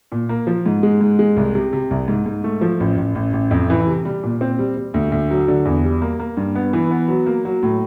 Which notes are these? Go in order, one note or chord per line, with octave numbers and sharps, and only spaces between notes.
A#2
A#3
F3
G#2
G#3
G#2
G#3
C2
C3
C3
C2
G#2
G#2
A3
F3
A1
A1
A1
A1
F2
E3
C3
G3
A#2
C4
G3
G3
D2
D2
F#3
D3
E2
G3
A#3
A#3
G2
B3
E3
B3
F#3
A#3
F#3
A2